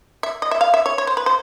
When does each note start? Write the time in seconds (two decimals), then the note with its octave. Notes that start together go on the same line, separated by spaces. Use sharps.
0.23 E5
0.42 D#5
0.51 E5
0.61 F5
0.74 E5
0.86 C#5
0.98 C#5
1.07 C5
1.17 B4
1.26 C5